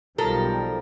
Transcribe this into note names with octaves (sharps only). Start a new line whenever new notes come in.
B1 D#3 F3 G3 A4 A#4